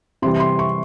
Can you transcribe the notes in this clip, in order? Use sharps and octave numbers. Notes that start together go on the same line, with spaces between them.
C3 E3 G3 C6
C6
C#6